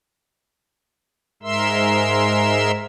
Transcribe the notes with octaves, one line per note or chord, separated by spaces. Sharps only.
G#2 G#3 A#4 E5 C6 E6